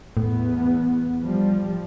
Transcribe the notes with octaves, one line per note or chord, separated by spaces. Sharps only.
E2 A2 B3
F3 G3